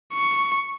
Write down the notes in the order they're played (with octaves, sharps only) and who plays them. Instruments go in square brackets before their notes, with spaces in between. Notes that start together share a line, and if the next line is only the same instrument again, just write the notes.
[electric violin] C#6